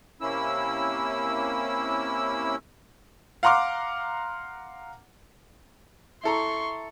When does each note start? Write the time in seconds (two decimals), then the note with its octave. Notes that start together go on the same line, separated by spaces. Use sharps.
0.21 C3 A#3 C#4 E4 E6
3.43 F5 F#5 A#5 C6 D6 F6
6.24 E4 A4 A#5 C6 C#6